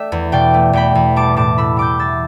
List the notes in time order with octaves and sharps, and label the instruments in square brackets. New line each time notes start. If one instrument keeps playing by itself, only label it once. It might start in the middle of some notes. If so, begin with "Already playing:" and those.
Already playing: [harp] A3 D5 E5 G5
E2
B2 D5 G5
A3
E2 G5 B5
E2
G3 A5 D6
A2 A5 D6
A2 B5 E6
G3 D6 G6
E3 E6 A6